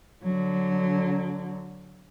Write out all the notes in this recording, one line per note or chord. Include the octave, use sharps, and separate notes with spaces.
D3 F#3